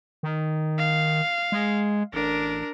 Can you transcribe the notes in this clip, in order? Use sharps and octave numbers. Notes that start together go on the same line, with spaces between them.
D#3
F5
G#3
A1 D4 A#4